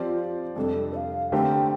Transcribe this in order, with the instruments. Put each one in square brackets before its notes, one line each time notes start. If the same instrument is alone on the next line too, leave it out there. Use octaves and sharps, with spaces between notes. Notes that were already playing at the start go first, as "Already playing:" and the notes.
Already playing: [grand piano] F3 C4 G4 D5 [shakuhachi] F4
[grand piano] F2 C3 G3 D4 [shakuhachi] A4
[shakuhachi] F5
[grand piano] D3 A3 C4 G4 A#4 [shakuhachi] G5